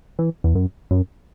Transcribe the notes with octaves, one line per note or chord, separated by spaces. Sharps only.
E3
E2
F#2
F#2